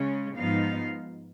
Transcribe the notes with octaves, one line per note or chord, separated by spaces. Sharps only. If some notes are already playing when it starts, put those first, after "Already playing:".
Already playing: C#3 G#3 C#4
G#2 F3 B3 D#4 F5